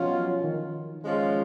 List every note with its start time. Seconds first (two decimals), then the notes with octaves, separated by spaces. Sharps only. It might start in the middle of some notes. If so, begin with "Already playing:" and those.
Already playing: B2 F3 F#3 C#4 F4
0.44 D#3
1.02 F3 G#3 C#4 F4